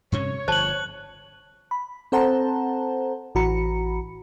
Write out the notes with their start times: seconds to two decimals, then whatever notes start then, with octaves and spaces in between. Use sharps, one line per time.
0.12 G2 C3 C#4 C#5
0.48 G1 F3 C5 A5 F#6 F#7
1.71 B5
2.12 C4 A4 C5 F#5 A5 A#5
3.35 A1 E3 F#4 A#5 B5 C#7